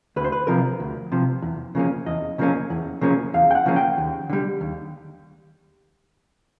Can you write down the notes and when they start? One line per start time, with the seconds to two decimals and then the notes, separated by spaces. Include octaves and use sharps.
0.16 D2 B4
0.24 C5
0.32 B4
0.47 C3 F3 A#4
0.80 D2
1.12 C3 F3
1.42 E2
1.75 C#3 F3 A#3 C#4
2.06 E2 D#5
2.38 C#3 F3 A#3 C#4
2.70 E2
3.01 C#3 F3 A#3 C#4
3.34 E2 F5
3.51 G5
3.55 F#5
3.66 C#3 F3 A#3 C#4
3.76 G5
3.98 D#2
4.30 D3 G3
4.61 D#2